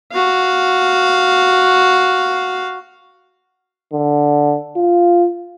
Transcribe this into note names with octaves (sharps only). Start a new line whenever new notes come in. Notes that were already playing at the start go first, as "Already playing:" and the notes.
F#4 F5
D3
F4